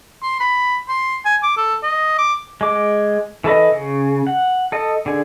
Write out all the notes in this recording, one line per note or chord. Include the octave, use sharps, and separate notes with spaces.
C6
B5
C6
G#5
D6
A4
D#5
D6
G#3 D6
E3 A4 B4 D#5
C#3
F#5
A4 D#5
D3 G#4